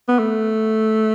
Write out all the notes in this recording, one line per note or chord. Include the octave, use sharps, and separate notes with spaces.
B3
A3